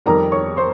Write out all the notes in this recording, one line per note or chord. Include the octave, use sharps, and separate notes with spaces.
F2 D#3 G3 A#4 A#5
C#5 C#6
C5 C6